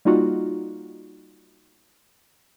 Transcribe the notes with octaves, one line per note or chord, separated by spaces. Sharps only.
G3 A#3 D#4 F4 F#4